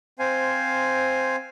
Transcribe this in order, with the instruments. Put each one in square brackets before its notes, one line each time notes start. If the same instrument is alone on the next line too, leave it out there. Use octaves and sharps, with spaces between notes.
[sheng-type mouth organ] C4 C5 F5 G#5